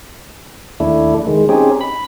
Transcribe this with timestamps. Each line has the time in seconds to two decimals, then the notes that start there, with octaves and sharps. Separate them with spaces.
0.80 D#2 A3 D4 E4
1.27 D#3 G#3
1.49 C4 C#4 D#4 G4 G#4
1.81 B5